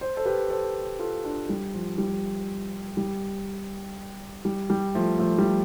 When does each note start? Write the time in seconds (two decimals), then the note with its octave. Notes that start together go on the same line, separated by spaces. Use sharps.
0.01 C5
0.17 A4 C5
0.25 G4 B4
0.50 A4 C5
0.99 F4 A4
1.25 D4 F4
1.49 G3
1.74 F3
1.98 G3
2.97 G3
4.45 G3
4.70 G3
4.95 F3 A3
5.19 F3 A3
5.38 G3